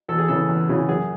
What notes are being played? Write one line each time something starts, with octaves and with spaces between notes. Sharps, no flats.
E2 A4
G#4
C#3 E3 A4
E2
C#3 E3
F#2 G#4